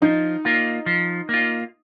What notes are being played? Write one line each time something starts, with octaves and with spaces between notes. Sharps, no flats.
F3 D#4
A#3 F4
F3
A#3 F4